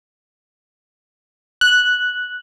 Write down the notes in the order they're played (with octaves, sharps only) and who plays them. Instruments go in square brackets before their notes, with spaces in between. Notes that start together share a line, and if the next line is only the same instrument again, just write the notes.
[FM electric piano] F#6